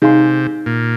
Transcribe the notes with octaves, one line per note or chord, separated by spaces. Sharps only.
C3 D#4 G#4 F5 C6
A#2